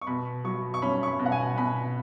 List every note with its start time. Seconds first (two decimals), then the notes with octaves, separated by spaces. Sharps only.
0.01 C#6
0.07 B2 B5
0.44 F#3 C#6
0.74 C#6
0.82 C#4 B5
1.03 C#6
1.07 B5
1.19 B2
1.26 F#5
1.32 G#5
1.57 B2 B5